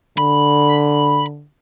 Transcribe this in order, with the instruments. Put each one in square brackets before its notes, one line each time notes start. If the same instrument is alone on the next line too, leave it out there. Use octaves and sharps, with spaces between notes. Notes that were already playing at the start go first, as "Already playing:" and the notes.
[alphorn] D3 [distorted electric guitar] B5